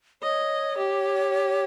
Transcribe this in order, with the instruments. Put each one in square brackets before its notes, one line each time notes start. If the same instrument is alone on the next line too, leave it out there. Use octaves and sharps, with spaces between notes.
[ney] C#5 [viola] D#5
[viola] G4